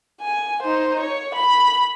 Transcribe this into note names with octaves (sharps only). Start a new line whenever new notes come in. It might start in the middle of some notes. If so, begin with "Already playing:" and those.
G#5
D#4 C5
C#5
B5